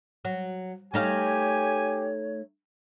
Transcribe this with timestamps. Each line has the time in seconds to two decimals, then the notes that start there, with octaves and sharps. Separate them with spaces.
0.25 F#3
0.94 A3 D#4 G4 C#5 F5 G#5